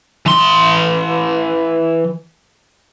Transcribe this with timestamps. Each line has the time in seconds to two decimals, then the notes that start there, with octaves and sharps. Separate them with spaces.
0.26 E3 C6